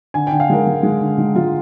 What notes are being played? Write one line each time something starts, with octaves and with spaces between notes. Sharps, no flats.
D3 G#5
G5
D3
F5
G#3 A#4
G#3
G#3
D3
G#3
G#3 F4